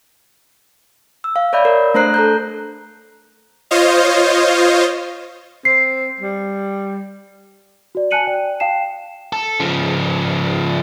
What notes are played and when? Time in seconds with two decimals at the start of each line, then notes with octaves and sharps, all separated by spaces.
1.24 E6
1.36 F5
1.53 C#5 D5 E5 B5 G6
1.65 A#4
1.94 A3 D4 C5 A#5 F#6 C7
2.14 A4 A#5 G6
3.71 F4 C5 C#5 D#5 F5
5.65 C4 C7
6.20 G3
7.95 F#4 D5
8.11 G#5 A5 F#6 C#7 D#7 F#7
8.27 D5 G5
8.60 F5 G5 A5 C7 E7
9.33 A4
9.60 C#3 F3